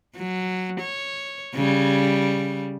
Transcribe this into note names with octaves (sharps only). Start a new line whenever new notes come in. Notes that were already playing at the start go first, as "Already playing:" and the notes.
F#3
C#5
C#3 G3